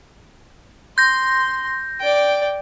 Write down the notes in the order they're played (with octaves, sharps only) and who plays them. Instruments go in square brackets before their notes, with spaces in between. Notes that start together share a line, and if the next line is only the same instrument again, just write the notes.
[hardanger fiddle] C6 [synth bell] G6 A#6
[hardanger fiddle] D5 G5